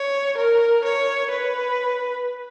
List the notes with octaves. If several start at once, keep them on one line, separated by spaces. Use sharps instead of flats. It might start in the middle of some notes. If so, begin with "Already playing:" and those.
Already playing: C#5
A#4
C#5
B4